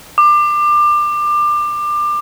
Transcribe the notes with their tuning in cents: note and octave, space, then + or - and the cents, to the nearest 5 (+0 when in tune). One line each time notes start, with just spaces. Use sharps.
D6 +25